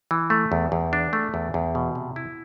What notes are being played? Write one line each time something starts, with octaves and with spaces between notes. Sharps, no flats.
E3
A3
E2
E2
D4
A3
E2
E2
B2
C3
E4